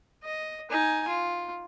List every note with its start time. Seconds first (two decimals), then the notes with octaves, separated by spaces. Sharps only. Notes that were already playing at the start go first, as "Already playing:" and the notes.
0.23 D#5
0.70 D#4 G#5
1.08 F4